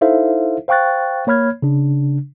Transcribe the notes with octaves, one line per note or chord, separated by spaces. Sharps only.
D#4 E4 A4 C5 E5 F5
C5 F5 G5 C#6 F#6 A6
A#3 C#5 B5 F6 G#6
C#3 D4